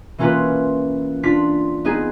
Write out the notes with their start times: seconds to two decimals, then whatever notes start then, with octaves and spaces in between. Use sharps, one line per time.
0.18 E3 A#3 C#4 F4 F#4 B4
1.23 D4 F4 B6
1.85 B3 C4 D#4 G#4